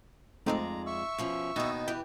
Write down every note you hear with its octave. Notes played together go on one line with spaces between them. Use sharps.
F2 G#3 A3 C4 D#4 D5 A#5
E5 C#6 E6
B2 F3 C#4
D#2 B2 D#3 D#4
E3 G4 B4 G5